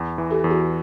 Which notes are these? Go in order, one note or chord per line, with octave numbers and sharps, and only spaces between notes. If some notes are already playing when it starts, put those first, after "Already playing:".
Already playing: E2
E3
G4 A4
E2
F#4 G#4